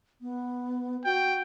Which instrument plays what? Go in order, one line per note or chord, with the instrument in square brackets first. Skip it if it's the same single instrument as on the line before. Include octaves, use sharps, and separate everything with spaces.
[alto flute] B3
[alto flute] F#4 [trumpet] G5